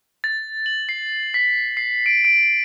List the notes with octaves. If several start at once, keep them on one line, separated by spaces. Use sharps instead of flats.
A6
F#7
C7
B6
C7
D7
D7